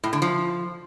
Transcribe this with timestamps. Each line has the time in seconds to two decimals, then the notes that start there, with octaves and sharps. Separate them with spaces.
0.04 A2
0.13 D3
0.22 F3